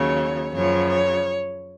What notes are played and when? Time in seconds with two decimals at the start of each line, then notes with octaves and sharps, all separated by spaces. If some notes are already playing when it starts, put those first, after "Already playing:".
Already playing: D#2 C#3 F#3 C#5
0.52 F#2 C#3 F3 C#5
0.90 C#5